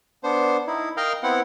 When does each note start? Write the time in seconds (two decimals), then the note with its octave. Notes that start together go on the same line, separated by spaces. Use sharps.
0.24 B3 D4 C5
0.67 D#4 E4
0.97 A#4 D#5 F5 G5 A#5
1.23 B3 C4 E4 F#5